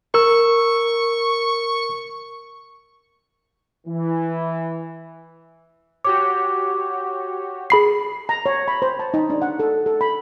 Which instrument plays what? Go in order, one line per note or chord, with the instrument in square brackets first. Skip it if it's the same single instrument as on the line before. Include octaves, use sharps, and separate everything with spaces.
[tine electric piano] A#4 E6 [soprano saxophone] C#6
[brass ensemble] E3
[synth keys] F#4 G4 C#5 [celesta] D6
[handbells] G#4 B5 C7
[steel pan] A#5
C#5
B5
C5
A5
D#4
D4
F#5
A4
A4
B5